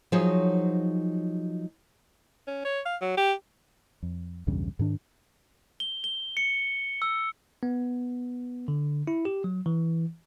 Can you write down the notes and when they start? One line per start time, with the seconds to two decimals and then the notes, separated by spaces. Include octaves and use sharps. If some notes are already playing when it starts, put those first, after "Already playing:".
0.12 F3 F#3 D#4 G#4 C#5
2.47 C#4
2.65 C#5
2.86 F5
3.01 F#3
3.17 G4
4.03 F2
4.47 B1 E2 G2 C#3
4.79 G#2 D#3 D4
5.80 G7
6.04 G7
6.37 C#7
7.02 E6
7.63 B3
8.68 D3
9.07 E4
9.25 G4
9.44 F#3
9.66 E3